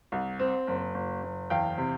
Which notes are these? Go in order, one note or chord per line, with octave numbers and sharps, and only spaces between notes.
C2
C4
F#1
F#1
F#1
E2 F5 G5
C3